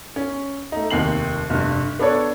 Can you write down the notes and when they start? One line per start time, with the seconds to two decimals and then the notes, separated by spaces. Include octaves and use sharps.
0.16 C#4
0.72 A3 D#4
0.90 F1 D#2 C4 C7 F#7
1.50 F1 G2
1.99 B3 D4 A4 C#5